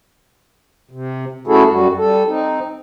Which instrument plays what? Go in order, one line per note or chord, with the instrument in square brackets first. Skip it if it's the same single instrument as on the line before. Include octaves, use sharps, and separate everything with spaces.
[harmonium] C3
A3 C#4 E4 F#4 G#4 A4
F#2 G3 F#4
G3 A4
C4 D#4